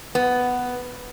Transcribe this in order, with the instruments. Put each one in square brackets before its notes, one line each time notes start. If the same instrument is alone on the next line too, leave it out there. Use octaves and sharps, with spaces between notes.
[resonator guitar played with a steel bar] B3